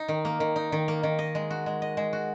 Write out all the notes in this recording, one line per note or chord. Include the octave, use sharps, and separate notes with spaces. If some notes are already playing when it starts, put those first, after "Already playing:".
Already playing: D#4
D#3
A#3
D#3
D#4
D#3
A#3
D#3
D#5
G#3
F#4
G#3
D#5
G#3
F#4